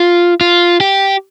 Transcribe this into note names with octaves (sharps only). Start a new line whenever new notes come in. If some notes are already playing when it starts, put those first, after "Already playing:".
Already playing: F4
F4
G4